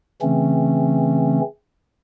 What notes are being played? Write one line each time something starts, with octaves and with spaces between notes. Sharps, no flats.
C#3 E3 A3 C4 C#4